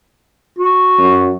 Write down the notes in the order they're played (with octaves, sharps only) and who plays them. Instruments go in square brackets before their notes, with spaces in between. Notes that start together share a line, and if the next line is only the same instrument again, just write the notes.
[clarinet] F#4
[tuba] F#2